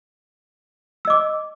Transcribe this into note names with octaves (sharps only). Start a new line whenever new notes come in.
D#5 D6 E6